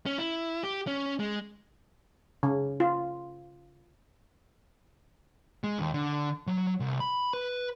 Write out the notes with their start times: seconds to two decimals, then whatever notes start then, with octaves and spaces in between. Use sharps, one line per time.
0.06 C#4
0.18 E4
0.64 G4
0.87 C#4
1.20 G#3
2.43 C#3
2.80 F4
5.64 G#3
5.79 D#2
5.93 D3
6.47 F#3
6.80 C2
7.00 B5
7.33 B4